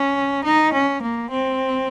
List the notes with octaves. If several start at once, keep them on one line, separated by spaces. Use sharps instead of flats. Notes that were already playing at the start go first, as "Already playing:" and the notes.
Already playing: C#4
D#4
C#4
A#3
C4